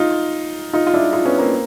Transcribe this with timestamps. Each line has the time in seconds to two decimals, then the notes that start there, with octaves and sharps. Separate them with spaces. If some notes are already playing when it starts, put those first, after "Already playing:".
Already playing: D#4 F4
0.73 D#4 F4
0.87 F4
0.94 D4 E4
1.13 D#4 F4
1.25 B3 C#4
1.38 A#3 C4